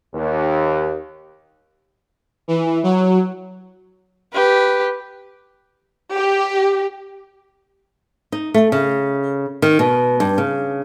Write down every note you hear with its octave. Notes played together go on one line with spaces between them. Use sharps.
D#2
E3
F#3
G4 B4
G4
D#4
A3
C#3
D#3
B2
G2
C#3